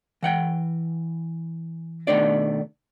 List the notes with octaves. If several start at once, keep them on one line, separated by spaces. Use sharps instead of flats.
E3 F#5 G5
B2 D#3 A3 D4 D5